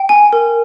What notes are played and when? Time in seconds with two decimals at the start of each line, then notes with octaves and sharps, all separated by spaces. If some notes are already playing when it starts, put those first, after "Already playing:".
Already playing: G5
0.09 G#5
0.33 A#4